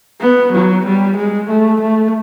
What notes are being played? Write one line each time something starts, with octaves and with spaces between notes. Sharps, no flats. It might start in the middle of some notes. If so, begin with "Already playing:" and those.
B3
F#3
G3
G#3
A3
A3